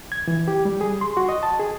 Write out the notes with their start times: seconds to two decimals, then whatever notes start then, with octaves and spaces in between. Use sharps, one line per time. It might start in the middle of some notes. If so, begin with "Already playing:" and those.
0.12 G#6
0.28 E3
0.48 G4
0.65 G3
0.81 G#4
1.01 C6
1.17 F#4
1.29 D#5
1.43 A5
1.60 G#4